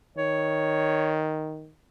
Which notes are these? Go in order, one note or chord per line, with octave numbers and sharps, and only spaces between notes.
D#3 C#5